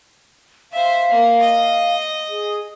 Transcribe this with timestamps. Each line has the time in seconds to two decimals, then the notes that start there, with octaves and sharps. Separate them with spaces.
0.72 C5 E5 F5
1.11 A#3
1.41 D#5
2.29 G#4